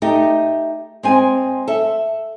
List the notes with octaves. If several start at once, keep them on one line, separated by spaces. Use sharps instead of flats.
A3 D#4 G4
G#3 C4 G#5
A4 E5